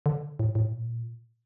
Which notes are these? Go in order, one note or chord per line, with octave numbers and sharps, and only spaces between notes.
D3
A2
A2
A#2